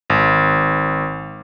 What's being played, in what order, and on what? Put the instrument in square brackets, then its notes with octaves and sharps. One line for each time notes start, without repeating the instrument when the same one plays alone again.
[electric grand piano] G#1